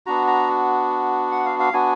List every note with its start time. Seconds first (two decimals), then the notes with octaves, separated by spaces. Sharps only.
0.06 B3 D4 F#4 A#5
0.27 A#5
1.32 F#5
1.45 F5
1.60 F5
1.73 B3 D4 F#4 G#5